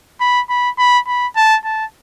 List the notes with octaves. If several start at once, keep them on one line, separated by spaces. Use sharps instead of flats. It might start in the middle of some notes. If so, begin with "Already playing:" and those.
B5
B5
B5
B5
A5
A5